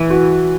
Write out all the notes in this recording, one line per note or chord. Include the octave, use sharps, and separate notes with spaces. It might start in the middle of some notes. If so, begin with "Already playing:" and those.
Already playing: E3
F#4